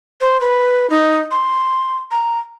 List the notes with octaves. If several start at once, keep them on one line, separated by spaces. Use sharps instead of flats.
C5
B4
D#4
C6
A#5